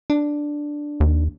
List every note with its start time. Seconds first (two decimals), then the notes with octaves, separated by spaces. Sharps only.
0.10 D4
1.00 D#2